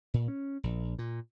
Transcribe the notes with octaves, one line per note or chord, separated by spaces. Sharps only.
A#2
C#4
A#1
A#2